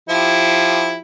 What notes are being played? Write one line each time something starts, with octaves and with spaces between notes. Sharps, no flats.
F3 E4 G4